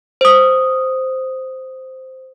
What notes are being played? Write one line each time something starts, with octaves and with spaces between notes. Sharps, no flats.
C5 D#6